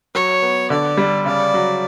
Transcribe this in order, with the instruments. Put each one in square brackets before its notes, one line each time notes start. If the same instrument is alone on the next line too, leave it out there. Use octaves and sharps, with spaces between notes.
[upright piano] F#3 [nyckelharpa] C#5
[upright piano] B3
[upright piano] D3 [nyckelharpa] D5
[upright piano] G3
[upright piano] C#3 [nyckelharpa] D5
[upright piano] F#3